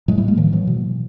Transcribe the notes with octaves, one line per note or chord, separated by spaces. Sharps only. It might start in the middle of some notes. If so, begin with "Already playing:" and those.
A2 F#3 G#3
G3 A3
G#3 A#3
A2 D#3 F3
E3 F#3
B2